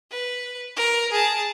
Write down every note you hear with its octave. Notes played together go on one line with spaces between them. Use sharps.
B4
A#4
G#4 A5